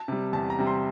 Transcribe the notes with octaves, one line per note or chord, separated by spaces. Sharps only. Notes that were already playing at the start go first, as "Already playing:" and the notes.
Already playing: A5
C3 G3
E2 A5
A#5
C3 G3
C6